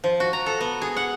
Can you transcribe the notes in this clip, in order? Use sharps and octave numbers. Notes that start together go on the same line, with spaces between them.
F3
F#4
A#5
A4
B3
G#4
F#5